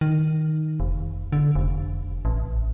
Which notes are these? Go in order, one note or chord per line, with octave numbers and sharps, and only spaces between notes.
D#3
F1
D3
F1
A1